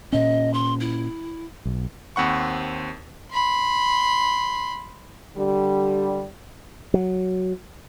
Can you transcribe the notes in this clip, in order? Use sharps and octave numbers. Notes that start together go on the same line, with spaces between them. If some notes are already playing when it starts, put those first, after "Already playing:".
A#2 C#4 D#5
C6
E4
B1
D#2 C4 C5 F#5 B5 C#6
B5 C6
D3 G3
F#3